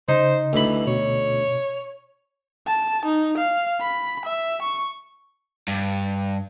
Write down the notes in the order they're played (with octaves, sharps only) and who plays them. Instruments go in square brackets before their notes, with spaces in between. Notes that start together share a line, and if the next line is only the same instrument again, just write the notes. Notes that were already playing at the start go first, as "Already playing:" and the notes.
[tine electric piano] C#3 [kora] D#4 [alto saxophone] C5
[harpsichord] D2 B5 [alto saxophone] E3
[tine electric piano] B2 [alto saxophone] C#5
[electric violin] A5
D#4
F5
B5
E5
C#6
[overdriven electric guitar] G2